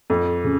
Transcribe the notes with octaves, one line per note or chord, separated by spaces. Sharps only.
F2
C#3